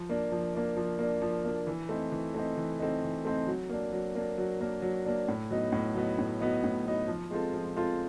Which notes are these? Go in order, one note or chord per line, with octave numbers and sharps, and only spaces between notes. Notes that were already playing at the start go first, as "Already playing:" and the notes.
Already playing: F3
A#3 D4
F3
A#3 D4
F3
A#3 D4
F3
A#3 D4
E3
A3 C4 D#4
E3
A3 C4 D#4
E3
A3 C4 D#4
E3
A3 C4 D#4
F#3
A#3 D4
F#3
A#3 D4
F#3
A#3 D4
F#3
A#3 D4
A2
F#3 B3 D#4
A2
F#3 B3 D#4
A2
F#3 B3 D#4
A2
F#3 B3 D#4
F3
G#3 C4 F4 A4
F3
G#3 C4 F4 A4